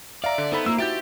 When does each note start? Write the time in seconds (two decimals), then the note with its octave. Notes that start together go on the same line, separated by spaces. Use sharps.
0.24 D5 E5 F5 A#5
0.38 D3
0.52 B3 D#4 A4 C5 B5
0.66 A#3 D#4 F4 E6
0.78 E4 F#4 G4 E5 G6 A6 D7